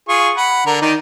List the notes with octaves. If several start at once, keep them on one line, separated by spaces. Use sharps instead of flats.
F4 G#4 C#6
F#5 B5
D3 A#4
D#3 D#4 D5